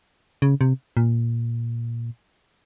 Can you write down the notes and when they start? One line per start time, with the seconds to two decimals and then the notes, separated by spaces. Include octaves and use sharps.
0.42 C#3
0.61 C3
0.97 A#2